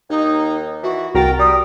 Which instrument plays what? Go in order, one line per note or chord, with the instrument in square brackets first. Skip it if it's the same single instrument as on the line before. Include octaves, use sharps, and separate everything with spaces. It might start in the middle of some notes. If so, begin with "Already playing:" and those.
[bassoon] D#2 [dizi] D#4
[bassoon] E3 [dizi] F#4
[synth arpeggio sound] C2 F#4 A6 [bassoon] A#4 [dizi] G5
[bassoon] G3 [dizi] D#6